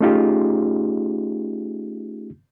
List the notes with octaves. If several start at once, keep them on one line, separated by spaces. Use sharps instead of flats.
A3 C#4 D#4 F4 G4 G#4